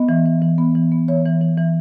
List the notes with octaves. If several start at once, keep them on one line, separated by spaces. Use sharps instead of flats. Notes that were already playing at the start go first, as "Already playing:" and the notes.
Already playing: B3 D#5
E3
E3
E3
B3
E3
B3
E3 C#5
E3
E3
E3